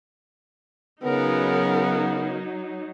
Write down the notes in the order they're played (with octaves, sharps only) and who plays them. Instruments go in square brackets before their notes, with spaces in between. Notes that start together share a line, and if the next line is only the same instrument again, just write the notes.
[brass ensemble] C#3 B3 [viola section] F#3 D#4 [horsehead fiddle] A#4